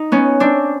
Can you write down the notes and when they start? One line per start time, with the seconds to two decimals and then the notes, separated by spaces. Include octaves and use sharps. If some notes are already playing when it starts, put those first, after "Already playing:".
Already playing: D#4
0.12 B3 C#4
0.40 C4 D4